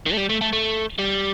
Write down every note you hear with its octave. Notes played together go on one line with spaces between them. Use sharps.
D#3
A3
G3
A3
A3
A3
G3